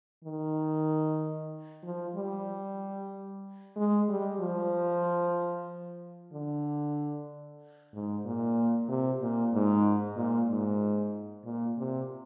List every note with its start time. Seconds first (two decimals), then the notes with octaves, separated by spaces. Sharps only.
0.24 D#3
1.84 F3
2.16 G3
3.77 G#3
4.09 G3
4.40 F3
6.33 D3
7.93 G#2
8.25 A#2
8.89 C3
9.22 A#2
9.54 G#2
10.17 A#2
10.49 G#2
11.45 A#2
11.78 C3